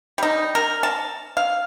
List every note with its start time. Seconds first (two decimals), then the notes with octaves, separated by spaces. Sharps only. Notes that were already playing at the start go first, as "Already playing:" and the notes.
0.18 G3 D#4
0.55 A#4
0.83 A5
1.37 F5